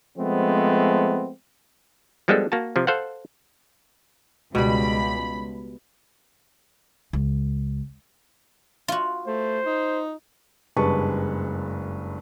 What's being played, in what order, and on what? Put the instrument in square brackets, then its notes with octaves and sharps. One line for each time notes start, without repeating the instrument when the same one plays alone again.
[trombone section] F3 G#3 A3 B3 C4
[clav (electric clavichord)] F3 G3 G#3 B3 D4 A4
A#3 F#4 A5
C3 F3
A4 C5 F5 F#5
[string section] C#2 B5 [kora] B2 G3
[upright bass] C#2
[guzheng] F4 F#4
[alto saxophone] A3 [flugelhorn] C5
[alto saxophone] D#4
[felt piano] F#1 G2 G#3 B4 A5 C#6